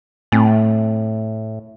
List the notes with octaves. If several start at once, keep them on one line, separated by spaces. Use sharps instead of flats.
A2 A3 C4 G#5